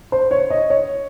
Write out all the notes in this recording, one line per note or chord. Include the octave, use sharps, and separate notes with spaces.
C5
C#5
D#5
C#5